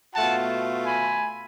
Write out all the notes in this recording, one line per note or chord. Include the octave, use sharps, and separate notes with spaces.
B2 A3 F4 F#5 A5
G#5 B5